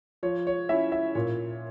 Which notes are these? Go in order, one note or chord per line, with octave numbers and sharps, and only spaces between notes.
F3 C#5
C#5
C#4 E4 E5
E5
A#2 C#5